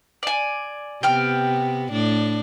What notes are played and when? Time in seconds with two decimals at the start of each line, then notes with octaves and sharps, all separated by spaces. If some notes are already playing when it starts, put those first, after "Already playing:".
0.23 D5 G#5
1.03 C3 B3 G5 F6
1.93 A2 D4